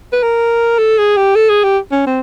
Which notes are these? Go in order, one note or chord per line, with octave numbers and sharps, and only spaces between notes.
B4
A#4
A4
G#4
G4
A4
G#4
G4
C#4
C4